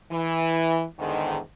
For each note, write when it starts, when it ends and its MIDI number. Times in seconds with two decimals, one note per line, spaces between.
0.11 0.84 52
0.99 1.38 40
0.99 1.38 44
0.99 1.38 50
0.99 1.38 51